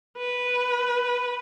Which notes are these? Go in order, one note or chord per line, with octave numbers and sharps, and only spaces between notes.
B4